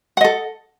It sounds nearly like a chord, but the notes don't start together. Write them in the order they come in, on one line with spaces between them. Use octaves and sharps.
F#5 D#5 A4